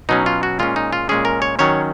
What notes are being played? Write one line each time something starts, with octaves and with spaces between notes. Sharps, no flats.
B2 F#3 C#4 D#4
F4
F#4
A#2 G#3 C#4 F4
D#4
F4
A#2 G#3 C#4 G#4
A#4
C#5
D#3 F#3 C#4 C#5